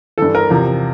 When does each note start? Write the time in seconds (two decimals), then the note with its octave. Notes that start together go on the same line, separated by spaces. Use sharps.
0.18 G2 E3 A4
0.35 A#4
0.50 E2 C3 F3